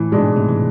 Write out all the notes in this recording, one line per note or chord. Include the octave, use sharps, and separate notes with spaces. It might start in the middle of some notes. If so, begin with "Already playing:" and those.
Already playing: A2 E3
G#2 B2 G#3 D4
A2 C3
E3